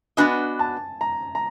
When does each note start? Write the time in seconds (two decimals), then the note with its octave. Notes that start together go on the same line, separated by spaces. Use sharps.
0.17 B3 D4 F#4 B4 D#5 G#5
0.59 A5
1.01 A#5
1.35 A#5